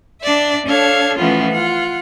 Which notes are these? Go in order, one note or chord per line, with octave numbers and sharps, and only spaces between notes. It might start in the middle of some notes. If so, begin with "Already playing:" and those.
D4 D5 E5
D4 A4 C#5 F5 G#6
E3 F3 A3 B3 C#4 F4
F4 F#5